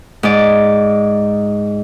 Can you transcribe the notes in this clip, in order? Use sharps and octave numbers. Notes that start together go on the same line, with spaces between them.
G#2 D5